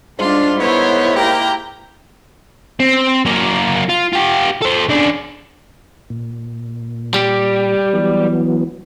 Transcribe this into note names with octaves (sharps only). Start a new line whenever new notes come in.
G#2 G3 D4 F4
B3 E4 A#4 C5 C#5
A#3 G4 A#4 G5 A#5
C4
F#3 A#3
F4
F4 G4
A4 C5
C#3 D4
A#2
G3 G4
E3 F#3 B3